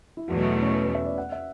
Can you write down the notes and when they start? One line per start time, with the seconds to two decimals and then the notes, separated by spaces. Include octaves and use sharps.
0.17 E4
0.28 E2 B2 F#3 A3 F#4
0.39 F#4
0.51 F#4
0.62 C#4
0.73 B4
0.84 B4
0.95 E5
1.06 D5
1.18 F#5
1.32 E5